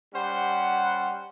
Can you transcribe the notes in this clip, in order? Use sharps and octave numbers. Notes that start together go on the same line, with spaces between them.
G3 C#4 C5 F#5